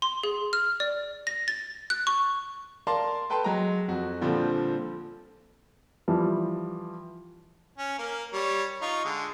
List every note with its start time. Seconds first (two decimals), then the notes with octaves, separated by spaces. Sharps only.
0.02 C6
0.23 G#4
0.53 F6
0.80 D5
1.27 A#6
1.48 A6
1.90 F#6
2.07 C#6
2.87 A#4 D5 F5 A5 C6
3.30 A4 B4 G5 A5 B5 C6
3.44 F#3 G#3 A#5
3.88 F2 F#4
4.21 A#2 D3 F3 G3 C4
6.08 E3 F3 G3
7.78 C#4
7.99 A#3 A#4
8.33 G3 C#5
8.82 D#4 F4 C#6
9.05 D3 G#3